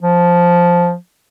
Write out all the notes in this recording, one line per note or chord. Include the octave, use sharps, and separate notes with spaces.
F3